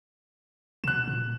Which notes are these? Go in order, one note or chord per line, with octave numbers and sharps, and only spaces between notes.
B2 F#6 E7
A#2